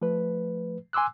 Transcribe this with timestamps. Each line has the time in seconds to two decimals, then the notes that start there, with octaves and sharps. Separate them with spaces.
0.02 F3 A3 B4
0.93 G#5 C6 D6 E6 F#6